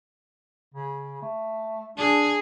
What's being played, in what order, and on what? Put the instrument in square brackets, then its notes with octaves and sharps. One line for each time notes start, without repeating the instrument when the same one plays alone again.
[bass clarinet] C#3
A3
[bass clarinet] D4 [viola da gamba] G#4